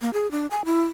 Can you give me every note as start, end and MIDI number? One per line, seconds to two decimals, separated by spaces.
0.01 0.10 58
0.13 0.30 68
0.31 0.47 62
0.51 0.62 80
0.65 0.83 64